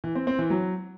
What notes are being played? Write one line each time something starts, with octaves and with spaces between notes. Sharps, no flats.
E3
C4
C4
E3
F#3